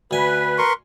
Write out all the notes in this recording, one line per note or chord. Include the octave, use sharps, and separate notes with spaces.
D2 B4 G#5
A#4 C6 C#6